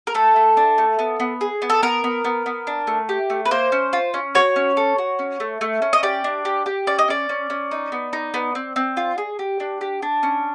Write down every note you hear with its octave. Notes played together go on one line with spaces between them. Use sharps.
A#4
A3 A4
A3
D4
A3
B3
B3
G#4
B3
A4
B3 A#4
B3
B3
B3
D4
A3
G4
A3
B4
A#3 C5
C#4
F4
C#4
F#4 C#5
C#4
A4
F#4
C#4
A3
A3
C#4
D#5
G4 D5
D4
G4
G4
C#4 D5
D#5
C#4 D5
C#4
C#4
D#4
B3
D#4
B3
C4
C4
F4
G#4
G4
D4
G4
D4
C#4